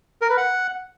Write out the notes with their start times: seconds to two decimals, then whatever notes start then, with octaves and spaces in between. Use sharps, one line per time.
0.21 A#4
0.29 B4
0.37 F#5